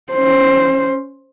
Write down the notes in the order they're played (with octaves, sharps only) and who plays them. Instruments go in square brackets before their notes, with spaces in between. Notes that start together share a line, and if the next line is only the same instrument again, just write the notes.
[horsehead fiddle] C#4 C5